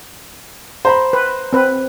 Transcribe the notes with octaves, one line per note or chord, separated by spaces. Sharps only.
C5 A#5 B5
B4
C4 B4